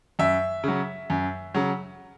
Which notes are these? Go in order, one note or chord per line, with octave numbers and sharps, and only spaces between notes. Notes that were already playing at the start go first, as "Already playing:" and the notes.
F#2 E5
C#3 F#3
F#2
C#3 F#3